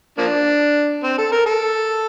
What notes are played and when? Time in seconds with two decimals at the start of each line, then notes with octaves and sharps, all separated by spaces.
0.18 F3 A#3 D4
1.03 C4
1.18 A4
1.32 A#4
1.46 A4